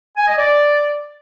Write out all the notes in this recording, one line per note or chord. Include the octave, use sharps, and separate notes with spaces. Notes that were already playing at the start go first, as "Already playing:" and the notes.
G#5
D#5
D5